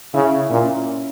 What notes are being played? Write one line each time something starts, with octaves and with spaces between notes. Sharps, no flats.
C#3 E4
A#2 C#4